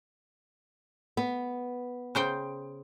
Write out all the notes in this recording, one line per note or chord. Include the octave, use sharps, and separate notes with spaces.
B3
C#3 C5 G5